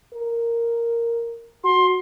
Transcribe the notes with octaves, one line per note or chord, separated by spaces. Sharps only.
A#4
F#4 C6